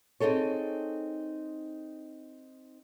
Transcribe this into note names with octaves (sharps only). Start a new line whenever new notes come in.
C4 D#4 G#4 A4 C#5